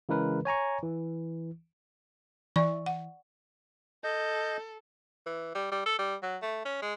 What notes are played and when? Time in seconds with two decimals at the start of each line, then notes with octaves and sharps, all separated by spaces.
0.09 C#3 E3 G#3 A#4 B4
0.45 C#5 G#5 A#5 C#6
0.83 E3
2.56 E3 D5 C#6
2.86 F#5
4.04 A4 D#5 G6
5.26 E3
5.55 G3
5.71 G3
5.86 A4
5.99 G3
6.22 F#3
6.42 A3
6.65 C#4
6.82 G#3